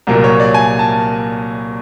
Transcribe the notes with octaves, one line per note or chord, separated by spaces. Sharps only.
C2 A#2 F#3 A#3
C#5
D5
G#5
A5